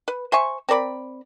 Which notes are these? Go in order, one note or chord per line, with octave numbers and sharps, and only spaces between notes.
B4
C5 E5 G#5 C#6
C4 A#4 D5 B5